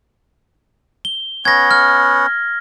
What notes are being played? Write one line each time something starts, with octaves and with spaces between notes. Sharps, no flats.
G7
B3 C#4 F#5 G#6 A#6
F6